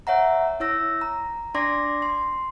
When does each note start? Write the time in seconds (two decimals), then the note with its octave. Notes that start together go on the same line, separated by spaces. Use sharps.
0.07 C#5 E5 F#5 A#5
0.60 E4 C#5 E6 A#6
1.01 A#5
1.54 D4 D5 C6 D6 A#6
2.02 C6